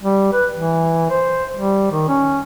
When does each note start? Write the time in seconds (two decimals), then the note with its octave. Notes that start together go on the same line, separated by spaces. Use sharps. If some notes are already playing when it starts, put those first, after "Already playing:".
0.03 G3
0.33 B4
0.54 E3
1.10 C5
1.54 G3
1.91 D#3
2.08 C#4